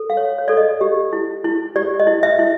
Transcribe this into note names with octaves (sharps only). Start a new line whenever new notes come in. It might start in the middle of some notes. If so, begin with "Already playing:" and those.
Already playing: A4
F5
C#5
C#5
A4 D5
D#5
G4
E4
E4
G4 D5
D#5
E4
E5
E4